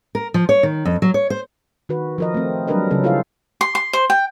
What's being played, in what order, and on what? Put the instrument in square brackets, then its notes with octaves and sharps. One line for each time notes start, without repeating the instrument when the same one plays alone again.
[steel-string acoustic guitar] A#4
F3
C#5
D#3
F2
F#3
C#5
C5
[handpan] D#3 F#4 B4
F3 A#4 D#5
A3 C4
F#3 G3 D4 A#4 B4 D#5
C#3 F#3 C#4 A4
E4 F4 A4 C5 F5
[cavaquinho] C6
C6
C5
G5